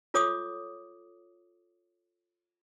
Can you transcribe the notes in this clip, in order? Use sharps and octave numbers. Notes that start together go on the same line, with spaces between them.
F4 A4 C#5 D6 D#6